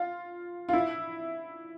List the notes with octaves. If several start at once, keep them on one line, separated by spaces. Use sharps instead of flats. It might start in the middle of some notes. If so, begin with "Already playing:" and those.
Already playing: F4
F4
E4